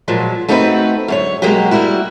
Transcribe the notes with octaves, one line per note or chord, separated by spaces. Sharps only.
A#2 F3 F#3 G#3
A3 C4 D#4 F#4 G#4 B4
F#2 D3 C#5
B2 F#3 G#3 A#3 F#4 G4
G3 A#3 E4 F#4